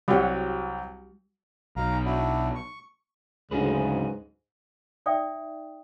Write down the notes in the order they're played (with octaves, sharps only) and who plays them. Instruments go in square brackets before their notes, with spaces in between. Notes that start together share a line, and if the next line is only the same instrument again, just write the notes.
[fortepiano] C2 F#3 G4 [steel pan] G3 F#4
[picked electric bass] B1 [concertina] F5 A#5
[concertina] D4 E4 F#4
C#6
[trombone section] D2 [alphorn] G#2 [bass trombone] C#3 [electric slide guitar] F#3 G#4 B4
[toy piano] D#4 D5 E5 G5 D#6